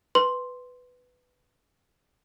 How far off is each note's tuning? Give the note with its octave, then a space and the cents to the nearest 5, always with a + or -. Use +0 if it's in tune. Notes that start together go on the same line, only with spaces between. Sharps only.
B4 +10 C6 +0